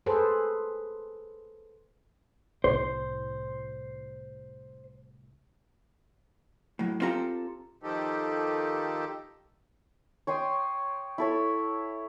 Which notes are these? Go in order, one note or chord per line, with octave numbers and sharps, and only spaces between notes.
G#4 A4 B4 C5
C2 A2 C5
A2 F#3
C4 F4 G4 A4 A#5
D#3 F3 D#4 G4 A4
C#5 G5 C6 D#6
E4 A4 C#5